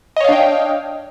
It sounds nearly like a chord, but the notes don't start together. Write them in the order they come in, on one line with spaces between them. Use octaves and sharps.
D#5 C#5 F5 D4 G5